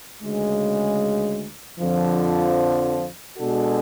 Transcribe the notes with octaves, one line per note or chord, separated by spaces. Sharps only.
D2 C#3 G#3
F2 D3 F3
B2 G#3 D4 F#4 A4